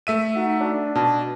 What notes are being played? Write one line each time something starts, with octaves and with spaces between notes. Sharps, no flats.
A3 E5 D#7
D#4 F#4
D4
B2 A5